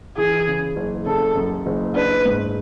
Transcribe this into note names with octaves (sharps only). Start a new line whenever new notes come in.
E3 G#4
C#3
F#1
C#3 A4
F#2
F#1
D4 B4
G#2